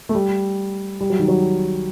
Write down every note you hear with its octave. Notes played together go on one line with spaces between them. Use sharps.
A3
G3
G3
F#3
D#3
F#3